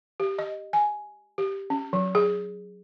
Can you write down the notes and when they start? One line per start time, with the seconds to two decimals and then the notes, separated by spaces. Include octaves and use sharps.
0.20 G4
0.38 D#5
0.73 G#5
1.38 G4
1.70 C#4
1.93 F#3
2.15 G#4